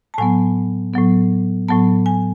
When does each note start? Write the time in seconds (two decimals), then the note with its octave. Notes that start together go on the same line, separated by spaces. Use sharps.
0.14 A5
0.18 A2 F#3 B3 G#5
0.93 A2 F#3 B3
1.68 A2 F#3 B3 A5
2.06 G#5